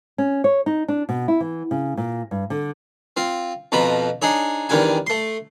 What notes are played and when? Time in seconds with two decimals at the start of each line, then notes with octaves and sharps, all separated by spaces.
0.18 C#4
0.44 C#5
0.66 D#4
0.88 D4
1.09 B2
1.28 E4
1.40 E3
1.71 C#3
1.97 A#2
2.31 G2
2.50 D3
3.17 C4 F4
3.72 F2 B2 F3 A#5 B5
4.22 D4 D#4 G#4 C#5
4.69 E2 D#3 G3 D4 G#5
5.07 A3 C6